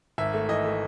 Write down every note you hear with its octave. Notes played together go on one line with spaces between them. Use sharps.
G#1 E5
A3
E3 D#5
A3